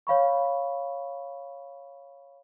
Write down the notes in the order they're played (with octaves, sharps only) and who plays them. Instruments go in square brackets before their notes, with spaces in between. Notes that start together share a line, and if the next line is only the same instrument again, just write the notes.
[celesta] C#5 F5 B5 C#6